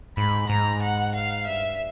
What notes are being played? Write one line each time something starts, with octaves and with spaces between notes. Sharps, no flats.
G#2 B5
G#2 A#5
F#5
F5
G2 E5